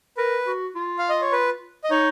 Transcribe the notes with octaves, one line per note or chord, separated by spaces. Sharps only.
A#4 B4
F#4
F4
F5
D#5
C#5
B4
D#5
D#4 C#5